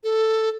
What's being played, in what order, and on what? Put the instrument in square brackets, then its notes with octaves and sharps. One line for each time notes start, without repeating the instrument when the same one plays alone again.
[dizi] A4